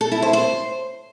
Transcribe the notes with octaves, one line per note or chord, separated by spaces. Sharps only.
A4
E4
C5
C5